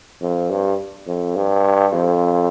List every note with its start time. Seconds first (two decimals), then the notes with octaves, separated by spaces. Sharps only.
0.21 F2
0.50 G2
1.07 F2
1.36 G2
1.93 F2